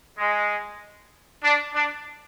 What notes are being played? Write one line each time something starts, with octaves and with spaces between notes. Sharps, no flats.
G#3
D4
D4